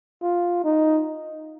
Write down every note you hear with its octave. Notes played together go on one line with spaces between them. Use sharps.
F4
D#4